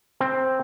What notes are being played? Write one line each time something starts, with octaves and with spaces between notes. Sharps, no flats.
C4